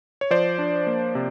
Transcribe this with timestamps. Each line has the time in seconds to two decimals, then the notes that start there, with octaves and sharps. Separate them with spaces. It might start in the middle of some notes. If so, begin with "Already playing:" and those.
0.21 C#5
0.31 F3 C5 D5
0.59 D4
0.87 A#3
1.15 C3